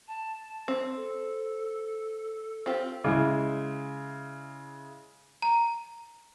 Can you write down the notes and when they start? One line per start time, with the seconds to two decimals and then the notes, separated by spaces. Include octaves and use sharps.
0.07 A5
0.68 C4
0.95 A4
2.66 C4 F4 G4
3.04 C#3 G#3 E4
5.42 A#5